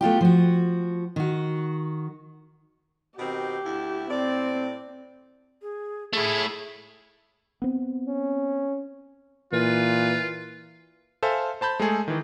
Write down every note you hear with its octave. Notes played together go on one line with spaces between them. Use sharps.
A3 B3 F4 G4
F3 F#4
D#3 F#4
B2 D#3 C4 G4
D2 E4
A2 C4 D5
G#4
A3 E4 G#4
B3 C4
C#4
A#2 E3 F4 B4
A4 C5 E5 F5 G#5
C5 A5 B5 G6
G#3 A3 G#4 A4
D#3 E3